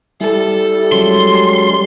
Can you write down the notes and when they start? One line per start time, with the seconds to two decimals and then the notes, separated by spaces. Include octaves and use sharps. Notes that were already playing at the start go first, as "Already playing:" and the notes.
0.21 G3 E4 A4
0.92 F#3 G#3 C#4 C6